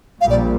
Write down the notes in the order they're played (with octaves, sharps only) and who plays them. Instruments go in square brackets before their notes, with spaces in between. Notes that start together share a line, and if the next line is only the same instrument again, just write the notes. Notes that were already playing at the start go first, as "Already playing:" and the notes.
[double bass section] A#1 A#2 G3 [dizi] F5
[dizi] D5